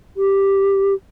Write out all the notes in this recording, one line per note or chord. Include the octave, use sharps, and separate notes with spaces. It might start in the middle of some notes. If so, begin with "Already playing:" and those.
G4